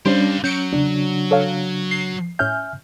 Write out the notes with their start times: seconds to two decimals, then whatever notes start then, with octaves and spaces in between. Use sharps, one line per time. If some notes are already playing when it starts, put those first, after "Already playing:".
0.06 G3 C#4 D4 G4 C5 F5
0.44 F#3 C#4 G6 C#7 D7
0.73 E2 C#3 D4
1.31 A4 C#5 F5
1.91 C7
2.39 A2 C#4 E5 G#5 F6 G6